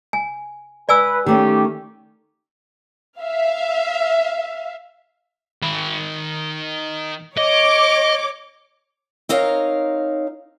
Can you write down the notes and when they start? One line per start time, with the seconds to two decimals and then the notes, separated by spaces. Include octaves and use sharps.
0.13 G#5
0.89 B4 D5 G#5 E6
1.26 D#3 A3 C#4 G4
3.20 E5 F5
5.63 D#3 B5
7.37 C#5 D#5 D6
9.29 C4 D#4 A#4 C#5 F5